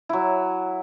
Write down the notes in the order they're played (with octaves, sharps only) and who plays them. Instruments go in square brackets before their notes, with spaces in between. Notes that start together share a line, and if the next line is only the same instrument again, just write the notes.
[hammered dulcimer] F#3 E4